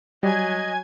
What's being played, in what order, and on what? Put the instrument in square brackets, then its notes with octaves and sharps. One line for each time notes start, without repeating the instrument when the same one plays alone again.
[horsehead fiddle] F#3 [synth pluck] G3 [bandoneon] D#5 [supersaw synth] G#5 G#6